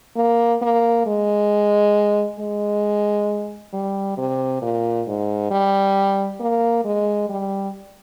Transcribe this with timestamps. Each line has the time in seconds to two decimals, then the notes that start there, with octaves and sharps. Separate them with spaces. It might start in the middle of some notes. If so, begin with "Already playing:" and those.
0.16 A#3
0.62 A#3
1.06 G#3
2.40 G#3
3.73 G3
4.17 C3
4.62 A#2
5.07 G#2
5.51 G3
6.40 A#3
6.85 G#3
7.29 G3